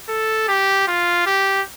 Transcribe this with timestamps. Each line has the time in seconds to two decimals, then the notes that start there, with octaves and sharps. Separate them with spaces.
0.09 A4
0.48 G4
0.87 F4
1.26 G4